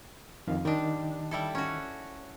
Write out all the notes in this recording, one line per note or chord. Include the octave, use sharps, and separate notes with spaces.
F2 D#3 F5
D#3 G3 D4 D#5
G3 E4 A4
C#4 F#4